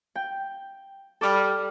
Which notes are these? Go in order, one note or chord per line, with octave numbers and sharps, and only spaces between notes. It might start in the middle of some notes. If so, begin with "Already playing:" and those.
G5
G3 A4 D6 F6